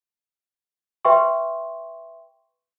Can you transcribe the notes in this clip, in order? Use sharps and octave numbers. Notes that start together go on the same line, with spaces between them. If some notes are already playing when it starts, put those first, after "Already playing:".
B4 E5 G5 C6 C#6